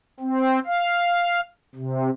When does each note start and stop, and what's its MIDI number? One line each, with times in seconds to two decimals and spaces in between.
0.20 0.59 60
0.66 1.40 77
1.75 2.10 48